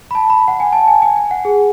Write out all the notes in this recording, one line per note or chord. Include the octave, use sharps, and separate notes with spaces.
B5
A5
B5
F#5
G#5
A5
G#5
G#5
G#5
F#5
G#4